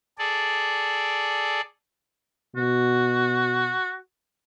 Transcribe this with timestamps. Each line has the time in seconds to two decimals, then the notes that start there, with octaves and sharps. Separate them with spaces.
0.18 G#4 A4 D5
2.56 B2 F#4